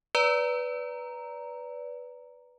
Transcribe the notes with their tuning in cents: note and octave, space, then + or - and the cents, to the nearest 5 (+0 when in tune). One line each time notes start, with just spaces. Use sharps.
B4 +0 D5 -20 A#5 +0